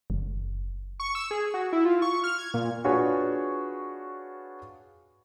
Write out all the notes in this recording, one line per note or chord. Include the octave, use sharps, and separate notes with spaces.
F#1
C#6
E6
G#4
F#4
E4
F4
C#6
F6
G#6
A#2
D4 F4 F#4 G#4 B4 C#5